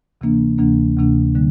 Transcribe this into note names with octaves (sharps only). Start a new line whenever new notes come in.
D2 C3 E3 A#3 D4
D2 C3 E3 A#3 D4
D2 C3 E3 A#3 D4
D3 G3 A#3